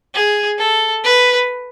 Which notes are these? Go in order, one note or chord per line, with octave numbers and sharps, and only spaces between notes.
G#4
A4
B4